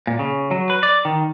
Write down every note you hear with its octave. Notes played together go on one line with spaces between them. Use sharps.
A#2
C#3
F#3
B4
D5
D#3